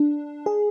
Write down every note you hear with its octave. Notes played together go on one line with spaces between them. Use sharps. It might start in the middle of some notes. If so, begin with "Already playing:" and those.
Already playing: D4
G#4